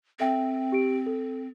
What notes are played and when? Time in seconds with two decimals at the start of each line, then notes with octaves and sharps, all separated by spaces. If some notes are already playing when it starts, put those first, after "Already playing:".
0.20 C4 A4 E5 G5
0.72 G4 D7
1.07 A4